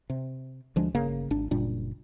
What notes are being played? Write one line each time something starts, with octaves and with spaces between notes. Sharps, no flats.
C3
D2 F3 G#3 D4
G1 C#3 A#3
G#1 D4
F#1 A#2 G3 D4